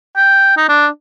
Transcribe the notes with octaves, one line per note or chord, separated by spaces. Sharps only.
G5
D#4
D4